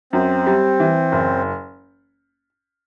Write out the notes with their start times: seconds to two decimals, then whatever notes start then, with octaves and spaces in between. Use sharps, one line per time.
0.13 F#2 C4
0.47 G3
0.80 E3
1.12 F#1